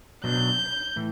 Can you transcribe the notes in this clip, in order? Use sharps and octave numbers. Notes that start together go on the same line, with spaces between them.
B2 F#3 B3 D4 G6
A2 E3